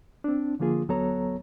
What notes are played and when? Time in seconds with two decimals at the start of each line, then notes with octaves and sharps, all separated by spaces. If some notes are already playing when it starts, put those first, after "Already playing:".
0.24 C4 D4
0.60 D3 F3 A#3 F4 G#4
0.89 D2 F#3 B3 A4 C#5 A#5